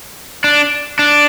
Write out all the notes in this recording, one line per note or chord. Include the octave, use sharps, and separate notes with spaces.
D4
D4